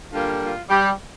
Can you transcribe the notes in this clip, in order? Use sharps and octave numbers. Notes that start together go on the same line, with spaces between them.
D3 G3 A#3 F4
F4
G3 G4